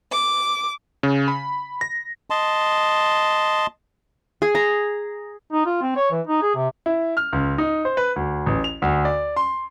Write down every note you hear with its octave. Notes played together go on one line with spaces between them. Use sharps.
D6
C#3
B5
A#6
D#5 A5 C6
G#4
A#5
D#4
F4
C4
C#5
E3
D#4
G#4
C3
E4
F6
C#2
D#4
C5
B4
D2
A1
F7
D2
D5
C6